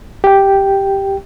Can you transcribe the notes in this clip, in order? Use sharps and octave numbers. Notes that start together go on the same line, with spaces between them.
G4 G5